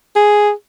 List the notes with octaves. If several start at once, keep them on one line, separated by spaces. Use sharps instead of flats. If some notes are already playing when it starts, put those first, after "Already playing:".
G#4